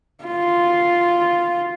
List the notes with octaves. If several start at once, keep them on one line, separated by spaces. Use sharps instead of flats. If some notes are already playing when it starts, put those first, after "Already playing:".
F4